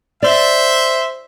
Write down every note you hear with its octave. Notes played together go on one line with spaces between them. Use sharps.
C5 D5 E5